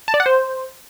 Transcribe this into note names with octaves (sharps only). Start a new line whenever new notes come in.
A5
D5
F#5
C5